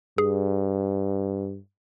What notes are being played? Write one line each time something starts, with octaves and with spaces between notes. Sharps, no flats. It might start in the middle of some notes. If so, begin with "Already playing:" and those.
G2 G#4